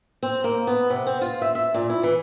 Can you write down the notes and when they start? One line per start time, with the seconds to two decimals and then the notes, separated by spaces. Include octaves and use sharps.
0.23 C4
0.44 A#3
0.67 B3
0.90 C3
1.07 C4
1.22 F4
1.42 E5
1.55 E5
1.74 A#2
1.90 E4
2.03 E3